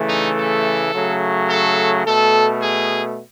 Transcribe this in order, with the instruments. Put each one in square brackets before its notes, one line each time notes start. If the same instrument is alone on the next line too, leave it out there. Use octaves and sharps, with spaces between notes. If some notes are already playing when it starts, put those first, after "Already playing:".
Already playing: [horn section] C#3 E3 A3
D#4
A4
C#3 F#3 A3
A4
B2 A3 A4
G#4